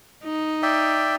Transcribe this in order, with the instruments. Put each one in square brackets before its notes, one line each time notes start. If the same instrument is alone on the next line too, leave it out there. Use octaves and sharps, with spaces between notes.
[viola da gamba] D#4
[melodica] D5 E5 G5